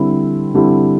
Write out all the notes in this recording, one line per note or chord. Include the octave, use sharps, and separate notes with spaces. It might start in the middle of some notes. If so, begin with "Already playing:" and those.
Already playing: D3 G3 C4 E4
D3 G3 C4 E4